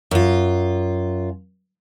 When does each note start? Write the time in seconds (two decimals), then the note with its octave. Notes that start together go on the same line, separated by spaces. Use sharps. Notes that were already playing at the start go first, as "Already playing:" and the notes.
0.11 F#2 F4